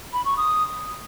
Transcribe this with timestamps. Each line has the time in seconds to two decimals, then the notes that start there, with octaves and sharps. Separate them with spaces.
0.13 B5
0.25 C#6
0.37 D#6